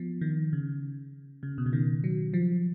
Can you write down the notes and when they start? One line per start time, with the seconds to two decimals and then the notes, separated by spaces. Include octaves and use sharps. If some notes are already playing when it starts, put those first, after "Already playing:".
Already playing: F3 B3
0.21 D#3
0.53 C#3
1.43 C#3
1.58 B2
1.66 C#3
1.73 D#3
2.04 F#3
2.34 F3